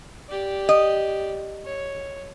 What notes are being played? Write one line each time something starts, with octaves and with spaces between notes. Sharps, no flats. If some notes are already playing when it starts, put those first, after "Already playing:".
G4 D5
D#5
C#5